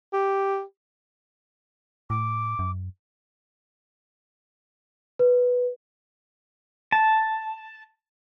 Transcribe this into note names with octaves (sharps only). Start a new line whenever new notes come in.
G4
A2 D6
F#2
B4
A5